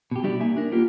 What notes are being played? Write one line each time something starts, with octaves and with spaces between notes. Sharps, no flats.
B2 G4
G3 D4 E4 F#4 G4 D5
A#3 D#4 E5 G#5
D4 A#4
A#3 B3 F4 G4